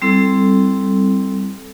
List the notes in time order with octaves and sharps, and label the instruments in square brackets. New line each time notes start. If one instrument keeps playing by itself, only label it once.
[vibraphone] G3 C4 E4 A4